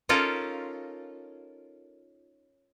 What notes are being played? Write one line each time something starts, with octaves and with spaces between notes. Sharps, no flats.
C#4 D#4 F4 A4 A#4